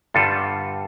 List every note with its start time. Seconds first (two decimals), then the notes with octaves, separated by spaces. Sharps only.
0.14 G2 D3 G3 F4 A4